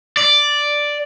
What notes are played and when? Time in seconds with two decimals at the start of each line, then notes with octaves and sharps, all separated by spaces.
0.17 D5